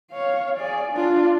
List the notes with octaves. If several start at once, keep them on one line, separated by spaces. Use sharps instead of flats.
C#5 F5
G#4 D5
D4 F4